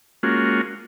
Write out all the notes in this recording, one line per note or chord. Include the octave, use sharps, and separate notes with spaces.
G#3 A#3 C#4 F4 F#4